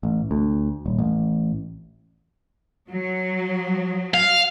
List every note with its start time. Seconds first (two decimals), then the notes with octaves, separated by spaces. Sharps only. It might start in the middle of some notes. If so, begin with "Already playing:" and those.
0.03 A1
0.31 D2
0.86 D#1
0.99 A1
2.90 F#3
4.14 F5